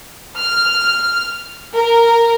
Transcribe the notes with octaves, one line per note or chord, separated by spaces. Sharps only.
F6
A#4